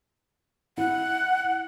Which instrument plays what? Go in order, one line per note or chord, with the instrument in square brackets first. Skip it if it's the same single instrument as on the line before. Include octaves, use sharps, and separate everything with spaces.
[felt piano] E4 [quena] F#5